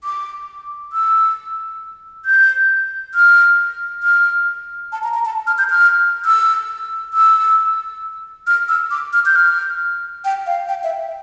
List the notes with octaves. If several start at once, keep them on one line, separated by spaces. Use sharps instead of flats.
D6
E6
G6
F6
F6
A5
A#5
A#5
A5
F6
G6
F6
E6
E6
F6
E6
D6
F6
G6
F6
G5
F5
G5
E5